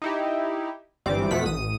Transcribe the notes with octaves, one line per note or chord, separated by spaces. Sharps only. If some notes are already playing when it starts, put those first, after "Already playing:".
D#4 E4 G4
G#1 G2 E3 G3 C4 D6
F2 B2 F3 A3 F#5 B6
A1 D#6 D#7